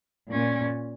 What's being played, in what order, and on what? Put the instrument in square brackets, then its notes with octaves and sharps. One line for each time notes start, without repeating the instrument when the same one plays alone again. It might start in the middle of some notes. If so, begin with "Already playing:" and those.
[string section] A#2 [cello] C#4